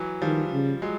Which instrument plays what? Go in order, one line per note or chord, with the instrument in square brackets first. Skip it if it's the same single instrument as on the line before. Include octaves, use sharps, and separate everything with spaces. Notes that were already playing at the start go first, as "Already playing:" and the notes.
Already playing: [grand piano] E3 F#3
[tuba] D#3 [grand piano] F3 G3
[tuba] C#3
[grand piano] F#3 G#3